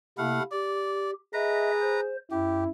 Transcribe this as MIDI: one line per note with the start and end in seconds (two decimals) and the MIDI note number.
0.18 0.40 48
0.18 0.43 57
0.18 0.40 58
0.18 0.40 64
0.18 0.43 77
0.18 0.43 78
0.51 1.13 67
0.51 1.11 74
1.34 2.15 68
1.34 2.01 71
1.34 1.71 75
1.34 1.71 76
1.34 2.01 82
1.81 2.17 72
2.31 2.66 42
2.31 2.69 64
2.31 2.64 67